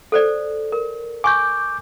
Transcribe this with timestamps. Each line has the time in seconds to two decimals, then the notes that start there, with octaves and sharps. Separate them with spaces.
0.12 A4 C5 D5
0.72 A#4
1.24 G#5 C#6 D6 G6